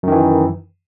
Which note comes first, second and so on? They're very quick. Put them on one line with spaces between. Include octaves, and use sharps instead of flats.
F#2 D#3 E3